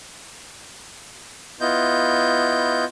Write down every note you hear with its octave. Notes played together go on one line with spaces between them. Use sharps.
B3 E4 F4 D#5 G6